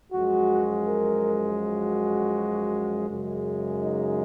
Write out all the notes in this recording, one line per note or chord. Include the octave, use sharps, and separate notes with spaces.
F#2 F3 G#3 F#4
A#4
F#4
F#2 C#3 G#3
D#4